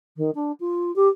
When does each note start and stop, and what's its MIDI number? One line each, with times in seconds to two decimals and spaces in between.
0.17 0.30 51
0.35 0.52 62
0.60 0.94 65
0.96 1.08 67